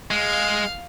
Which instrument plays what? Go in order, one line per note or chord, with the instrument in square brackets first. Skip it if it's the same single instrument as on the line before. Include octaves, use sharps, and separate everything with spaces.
[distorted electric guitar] G#3 [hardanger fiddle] F5